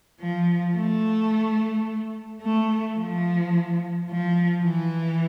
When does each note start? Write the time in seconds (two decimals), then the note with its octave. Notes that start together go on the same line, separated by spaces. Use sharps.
0.21 F3
0.76 A3
2.42 A3
2.98 F3
4.09 F3
4.64 E3